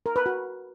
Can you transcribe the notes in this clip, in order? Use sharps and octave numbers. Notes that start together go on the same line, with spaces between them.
A#4
B4
F#4